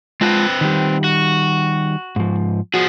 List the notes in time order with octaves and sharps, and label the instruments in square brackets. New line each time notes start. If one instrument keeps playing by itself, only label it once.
[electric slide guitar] G#3 F4 A5 [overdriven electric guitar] C4 B4
[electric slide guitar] D#3 G3
[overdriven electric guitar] F#4
[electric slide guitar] G#2 F3
[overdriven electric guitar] F3 G#4 [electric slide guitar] F#4